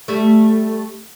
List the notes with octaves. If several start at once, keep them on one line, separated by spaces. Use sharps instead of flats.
G3 A3